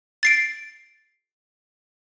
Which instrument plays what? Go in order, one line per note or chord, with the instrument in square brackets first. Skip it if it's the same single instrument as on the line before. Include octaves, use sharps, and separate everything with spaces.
[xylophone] A6 C7 D7